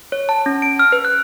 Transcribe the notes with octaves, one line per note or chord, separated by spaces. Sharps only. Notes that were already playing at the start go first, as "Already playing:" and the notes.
C#5
A5
C#4
D7
F6
B4
F#6